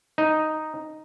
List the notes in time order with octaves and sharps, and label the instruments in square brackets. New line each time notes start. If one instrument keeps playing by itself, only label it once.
[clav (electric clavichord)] D#4